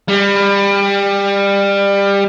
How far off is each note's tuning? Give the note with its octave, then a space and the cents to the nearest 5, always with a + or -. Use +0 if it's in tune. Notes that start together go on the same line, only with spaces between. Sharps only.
G3 +25